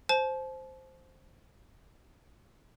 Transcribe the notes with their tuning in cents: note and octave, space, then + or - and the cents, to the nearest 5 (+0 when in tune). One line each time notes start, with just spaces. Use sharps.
C5 +0 A5 -35